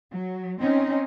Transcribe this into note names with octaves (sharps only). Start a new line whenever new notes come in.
F#3
C4 C#4 D#4